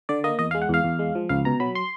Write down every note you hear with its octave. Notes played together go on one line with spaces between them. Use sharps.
D3 D5
A#3 D#5
E2 D#5
F5
G#3
F#5
E2 F5
E2
G#3
F3
C#2 F5
B2 A#5
F#3 B5
C6